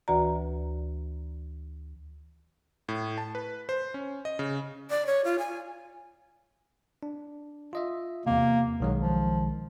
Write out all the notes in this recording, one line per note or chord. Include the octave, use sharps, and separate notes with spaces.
D2 E3 F#4 B4 D5 A#5
A2
A5
B4
C5
C#4
D#5
C#3
D5
C#5
F4
G#5
D4
F4 D#5 E5
E2 C3 A#3
B1 D#3 F#3 G#3
F3